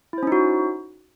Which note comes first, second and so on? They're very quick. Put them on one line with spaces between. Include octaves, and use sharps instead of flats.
E4 C5 C#4 D#4 F#4